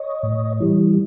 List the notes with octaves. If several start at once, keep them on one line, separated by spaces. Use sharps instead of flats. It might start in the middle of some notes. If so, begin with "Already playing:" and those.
Already playing: C#5 D#5
A2
E3 G3